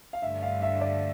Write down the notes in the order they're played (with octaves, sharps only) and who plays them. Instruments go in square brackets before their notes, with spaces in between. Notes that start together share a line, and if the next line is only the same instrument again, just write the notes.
[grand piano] F5
[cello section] G2 D3 A3 [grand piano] E5
[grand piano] F5
E5
D5